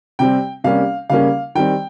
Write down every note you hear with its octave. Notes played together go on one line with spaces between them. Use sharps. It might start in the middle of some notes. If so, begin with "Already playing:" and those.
C3 G3 C4 G5
C3 G3 A#3 C#4 F5
C#3 G3 A#3 C#4 F5
D#3 G3 C4 G5